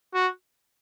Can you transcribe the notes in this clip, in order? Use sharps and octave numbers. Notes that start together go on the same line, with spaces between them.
F#4